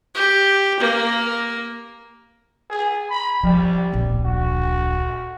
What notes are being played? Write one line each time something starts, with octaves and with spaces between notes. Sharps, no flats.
G4
A#3
G#4
B5
F3 G3
D1 A#1
F#4